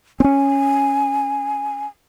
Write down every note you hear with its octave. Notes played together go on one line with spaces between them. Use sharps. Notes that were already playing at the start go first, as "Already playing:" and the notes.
C4 C#4 G#5